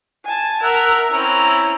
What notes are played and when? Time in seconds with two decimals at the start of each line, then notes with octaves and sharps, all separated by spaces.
0.25 G#5 A5
0.63 A#4 E5 F#5
1.11 C4 C#4 E4 A#5